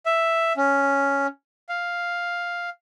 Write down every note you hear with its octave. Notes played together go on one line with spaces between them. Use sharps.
E5
C#4
F5